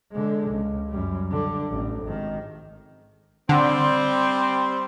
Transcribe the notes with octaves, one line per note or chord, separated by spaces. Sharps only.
D3 G#3
C#2
F#2 G3
D3
A1
G#1 D#3
D3 G3 C4 C6